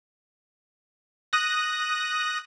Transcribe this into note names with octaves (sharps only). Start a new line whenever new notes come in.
D#6 F#6 A#6